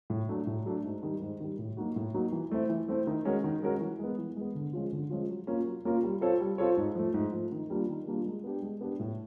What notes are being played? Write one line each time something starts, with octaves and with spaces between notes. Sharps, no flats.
A2
F#3 A3 D4
A2
F#3 A3 D4
G#2
D#3 G3
G#2
D#3 G3
A2
F#3 A#3 D#4 F#4
A2
F#3 A#3 D#4 F#4
E3
A3 C4 E4
E3
A3 C4 E4
D#3
G#3 C#4 F#4 A#4
D#3
G#3 C#4 F#4 A#4
E3
G#3 B3
E3
G#3 B3
D3
F3 G#3 C#4 F4
D3
F3 G#3 C#4 F4
F#3
A#3 C#4 F4 A#4
F#3
A#3 C#4 F4 A#4
G3
C4 F4 A4 C#5
G3
C4 F4 A4 C#5
G#2
F3 A3
G#2
F3 A3
D#3
G3 A#3 D4 F4
D#3
G3 A#3 D4 F4
G#3
B3 D4 G4
G#3
B3 D4 G4
A2